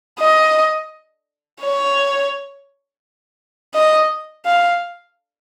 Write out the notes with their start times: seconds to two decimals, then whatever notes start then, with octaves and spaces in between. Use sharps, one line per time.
0.19 D#5
1.60 C#5
3.75 D#5
4.46 F5